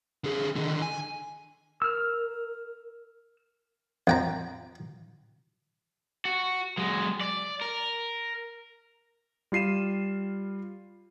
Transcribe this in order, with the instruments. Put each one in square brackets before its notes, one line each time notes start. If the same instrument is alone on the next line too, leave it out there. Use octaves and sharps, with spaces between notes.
[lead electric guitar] D3 G#4
D3 D#3
G#5
[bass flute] A#4 [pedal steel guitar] E6 F6
[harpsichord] F2 G5 A#5
[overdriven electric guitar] F#4
F#3 G#3
D5
A#4
[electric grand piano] G3 F4 C7 D#7 E7